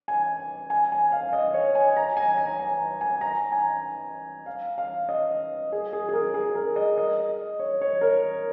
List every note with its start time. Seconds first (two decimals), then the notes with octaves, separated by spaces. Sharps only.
0.08 G#5
0.70 G#5
0.92 G#5
1.12 F5
1.33 D#5
1.54 C#5
1.75 G#5
1.96 A#5
2.17 G#5
2.38 A#5
2.59 G#5
3.01 G#5
3.21 A#5
3.52 G#5
4.46 F5
4.78 F5
5.09 D#5
5.72 G#4
5.93 G#4
6.09 G#4
6.13 A#4
6.34 G#4
6.56 A#4
6.76 D#5
6.98 D#5
7.59 C#5
7.81 C#5
8.01 A#4